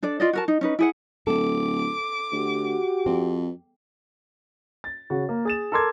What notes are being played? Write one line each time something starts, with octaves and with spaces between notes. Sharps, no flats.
D4 A4 D5
F4 D5 D#5
F#4 A#4 A5
D#4
C#4 D#4 B4
E4 G#4 F#5
D1 A4 D6
D2 F#4 G4
F2 C4
A6
C#3 F#4
A#3
G#4 A6 E7
A4 A#4 A#5 C6 D6 G#6